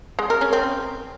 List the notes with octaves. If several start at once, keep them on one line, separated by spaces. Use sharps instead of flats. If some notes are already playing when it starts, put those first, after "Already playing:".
G#3
A#4
C#4
C4